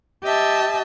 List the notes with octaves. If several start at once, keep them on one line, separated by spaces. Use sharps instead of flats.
G4 D#5 E5 A5